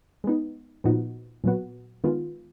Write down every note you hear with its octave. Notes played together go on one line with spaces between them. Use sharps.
G#3 B3 D#4
A#2 F3 B3 D#4 F#4
A#2 F#3 B3 F#4
D#3 G#3 B3 F4